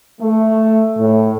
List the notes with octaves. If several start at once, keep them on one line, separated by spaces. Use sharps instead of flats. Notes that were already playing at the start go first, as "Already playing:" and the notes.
A3
A2